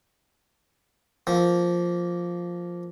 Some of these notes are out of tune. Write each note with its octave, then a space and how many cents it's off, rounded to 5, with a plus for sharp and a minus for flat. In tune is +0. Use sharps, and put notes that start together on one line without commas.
F3 +0 A#3 +0